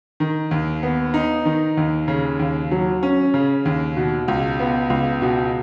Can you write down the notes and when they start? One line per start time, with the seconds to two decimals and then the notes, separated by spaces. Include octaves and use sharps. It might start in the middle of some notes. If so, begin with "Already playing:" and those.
0.20 D#3
0.51 D#2
0.83 B3
1.14 D#4
1.45 D#3
1.77 D#2
2.08 C#3
2.39 D#2
2.71 F#3
3.03 C#4
3.34 C#3
3.65 D#2
3.97 B2
4.28 C#2
4.60 B3
4.90 C#2
5.22 B2